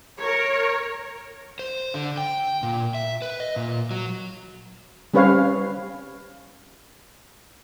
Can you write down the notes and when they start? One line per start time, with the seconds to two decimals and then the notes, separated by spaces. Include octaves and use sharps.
0.18 A#4 C#5
1.59 C5
1.94 D3
2.18 G5
2.63 A#2
2.94 E5
3.22 B4
3.40 D#5
3.56 A#2
3.91 F#3
5.14 G3 C4 C#4 B4 C#5 F5